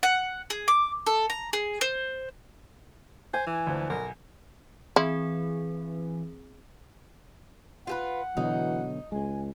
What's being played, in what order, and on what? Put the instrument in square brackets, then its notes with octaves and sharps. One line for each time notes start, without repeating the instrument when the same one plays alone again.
[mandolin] F#5
G#4
D6
A4
A#5
G#4
C5
[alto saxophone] C5 [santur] G#5
[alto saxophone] E3
[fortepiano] D2 F3
[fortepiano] B1 [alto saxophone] A#4
[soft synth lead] E3 [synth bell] C4 G#4 [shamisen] E4
[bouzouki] F4 G4 B4 [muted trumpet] F#5
[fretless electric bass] B2 D3 F#3 [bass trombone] E3 [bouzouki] D#4
[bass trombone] C#2 [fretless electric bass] G#3 [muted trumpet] G#5